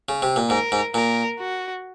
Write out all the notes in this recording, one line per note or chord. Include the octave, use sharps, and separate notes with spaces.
C#3
C3
A#2
G#2 A#4
G#2
A#2 A#4
F#4